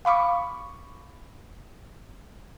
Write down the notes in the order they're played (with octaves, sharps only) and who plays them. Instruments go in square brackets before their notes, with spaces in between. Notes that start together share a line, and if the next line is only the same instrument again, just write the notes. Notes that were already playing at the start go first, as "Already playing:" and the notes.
[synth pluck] F5 B5 C#6 D6